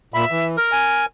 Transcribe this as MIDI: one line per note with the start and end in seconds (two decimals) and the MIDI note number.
0.14 0.25 46
0.14 0.46 76
0.14 0.25 83
0.31 0.57 52
0.56 1.04 70
0.72 1.06 80